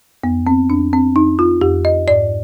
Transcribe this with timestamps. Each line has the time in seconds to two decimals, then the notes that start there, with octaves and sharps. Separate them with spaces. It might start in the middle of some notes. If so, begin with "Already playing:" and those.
0.24 F2 B3
0.47 C4
0.70 F2 D4
0.93 C4
1.16 F2 D#4
1.39 F4
1.61 F2 G4
1.85 D#5
2.07 G#2 D5